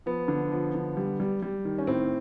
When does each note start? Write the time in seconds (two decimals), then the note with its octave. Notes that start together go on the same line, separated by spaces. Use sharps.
0.06 F3 B3
0.28 D3
0.52 F3
0.75 D3
0.97 G3
1.20 G3
1.42 G3
1.65 D#3
1.78 C#4
1.87 A2 C4